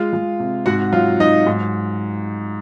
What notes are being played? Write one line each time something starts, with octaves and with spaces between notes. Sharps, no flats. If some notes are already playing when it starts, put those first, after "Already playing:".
Already playing: G#3 F4 F5
G#3
C3
G#2 F#4 F#5
F#3 F4 F5
F#3 D#4 D#5
G#2